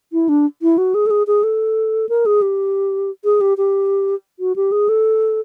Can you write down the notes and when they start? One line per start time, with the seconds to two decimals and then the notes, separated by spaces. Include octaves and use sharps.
0.13 E4
0.29 D4
0.62 E4
0.78 F#4
0.94 G#4
1.06 A4
1.11 G#4
1.27 G#4
1.43 A4
2.09 A#4
2.26 G#4
2.42 G4
3.24 G#4
3.41 G4
3.58 G4
4.40 F#4
4.56 G4
4.72 G#4
4.89 A4